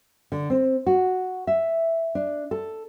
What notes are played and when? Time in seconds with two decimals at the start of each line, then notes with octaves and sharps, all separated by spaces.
0.32 D3
0.50 C4
0.87 F#4
1.47 E5
2.15 D4
2.51 A4